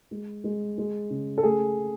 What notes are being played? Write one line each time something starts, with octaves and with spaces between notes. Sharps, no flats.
G#3
G#3
G#3
C#3
A4
A3 G#4